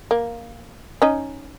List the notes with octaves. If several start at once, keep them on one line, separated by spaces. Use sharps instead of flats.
A#3
C#4 D#4